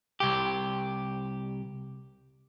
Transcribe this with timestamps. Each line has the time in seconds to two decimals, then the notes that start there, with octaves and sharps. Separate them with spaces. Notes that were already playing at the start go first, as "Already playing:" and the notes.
0.20 C2 G4